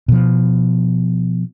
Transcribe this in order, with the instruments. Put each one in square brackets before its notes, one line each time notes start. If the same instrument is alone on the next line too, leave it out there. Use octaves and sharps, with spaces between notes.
[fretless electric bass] B2 F3